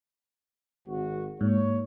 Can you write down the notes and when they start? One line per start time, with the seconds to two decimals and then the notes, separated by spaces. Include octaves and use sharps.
0.87 G#1 F#4
1.41 G#2 A#3 C#5